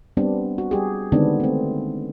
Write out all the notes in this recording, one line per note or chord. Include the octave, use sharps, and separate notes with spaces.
G3 B3 C4 D4
F#4
G3 G4 G#4
D3 D#3 G#3 B3 C4 D4
A3 C4